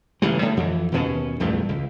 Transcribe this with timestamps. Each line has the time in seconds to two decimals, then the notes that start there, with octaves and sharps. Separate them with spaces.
0.22 A1 C#3 E3 G3
0.42 A2 D3
0.57 F2 E3
0.92 D#2 B2 C#4
1.40 A#1 E2 G2 A3
1.69 C#2